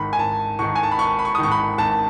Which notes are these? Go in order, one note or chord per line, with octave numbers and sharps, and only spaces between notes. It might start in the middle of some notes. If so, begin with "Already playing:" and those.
Already playing: G#1 G#2 D#3 B5
G#5
G#1 A5
G#2 D#3 C#6
G#5
A5
B5
G#1 C#6
B5
C#6
D#6
G#2 D#3 C#6
B5
G#1 A5